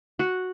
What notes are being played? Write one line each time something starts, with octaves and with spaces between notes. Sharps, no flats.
F#4